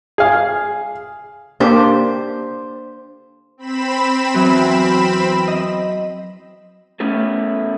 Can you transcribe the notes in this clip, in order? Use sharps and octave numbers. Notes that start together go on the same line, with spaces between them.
G#4 F5
A#3 D4 G4 C5
C4 B5 E7
E2 E3 F#3
D#5
A3 B3 C#4 E4 A4